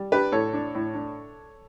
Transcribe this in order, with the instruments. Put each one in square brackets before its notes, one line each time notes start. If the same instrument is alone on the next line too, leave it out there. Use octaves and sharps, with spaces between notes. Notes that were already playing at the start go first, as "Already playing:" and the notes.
Already playing: [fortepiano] G3
[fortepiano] D4 [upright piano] G4 B4
[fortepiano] A2 [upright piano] A4 C#5
[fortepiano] D4
A2
D4